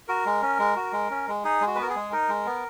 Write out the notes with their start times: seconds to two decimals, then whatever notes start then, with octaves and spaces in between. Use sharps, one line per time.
0.08 F#4 A#4
0.26 G#3
0.42 C#4
0.59 G#3
0.76 F#4
0.93 G#3
1.10 C#4
1.28 G#3
1.44 D#4 G#4
1.61 G#3
1.67 F#4
1.75 B4
1.78 B3 A#4
1.90 G#4
1.96 G#3
2.12 D#4 A#4
2.29 G#3
2.46 B3